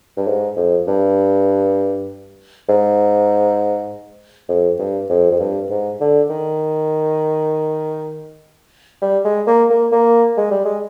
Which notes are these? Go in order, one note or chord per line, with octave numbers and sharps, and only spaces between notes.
G2
G#2
F2
G2
G#2
F2
G2
F2
F2
G2
G#2
D3
D#3
G3
G#3
A#3
A#3
A#3
G#3
G3
G#3